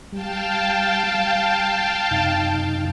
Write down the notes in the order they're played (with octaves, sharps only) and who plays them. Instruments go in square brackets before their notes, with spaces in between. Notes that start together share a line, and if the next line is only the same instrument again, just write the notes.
[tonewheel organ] G3 [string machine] F5 G5 A5
[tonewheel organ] G3
F#2 C3 D#4